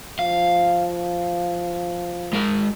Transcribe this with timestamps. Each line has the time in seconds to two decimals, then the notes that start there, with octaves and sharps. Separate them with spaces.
0.19 F3 F5
2.33 G#3 A#4